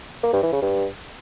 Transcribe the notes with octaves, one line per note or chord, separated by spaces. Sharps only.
A#3
G2
E3
C#3
G2